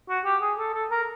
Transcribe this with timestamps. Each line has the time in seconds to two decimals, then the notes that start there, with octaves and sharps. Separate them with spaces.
0.09 F#4
0.25 G4
0.41 G#4
0.58 A4
0.74 A4
0.91 A#4